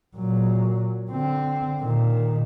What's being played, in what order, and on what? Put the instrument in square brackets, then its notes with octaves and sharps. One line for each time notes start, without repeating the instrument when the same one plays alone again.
[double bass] A#2 F#3
D3 C4
A#2 D#3